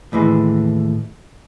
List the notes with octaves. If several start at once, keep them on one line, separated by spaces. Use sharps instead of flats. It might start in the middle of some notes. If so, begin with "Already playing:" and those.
D#2 A2 E3 G#3